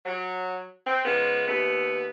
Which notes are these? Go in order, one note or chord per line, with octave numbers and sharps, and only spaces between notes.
F#3
C4
C#3 F3 G#3 B3
D#2 A3 B3